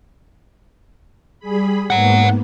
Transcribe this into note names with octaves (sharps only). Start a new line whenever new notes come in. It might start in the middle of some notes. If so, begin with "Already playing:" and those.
G3 G#4 B5
G#2 A#3 B3 C#5 F#5